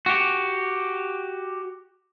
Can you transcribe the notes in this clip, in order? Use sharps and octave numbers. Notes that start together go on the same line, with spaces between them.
F#4 G4